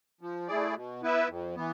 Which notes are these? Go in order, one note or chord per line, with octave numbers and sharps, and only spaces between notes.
F3
A3 E4 G#4 D5
B2
B3 E4 B4 E5
F2
E3 B3